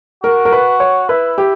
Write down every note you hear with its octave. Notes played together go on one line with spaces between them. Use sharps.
F#4 A#4
A#4
B4
C#5
E4 B4
G4